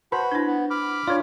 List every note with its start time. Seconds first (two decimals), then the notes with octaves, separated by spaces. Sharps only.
0.12 F#4 B4 C5 A5 B5
0.32 D4 E4
0.47 B3
0.70 B5 D6 F6
1.08 D4 F4 C#5 D5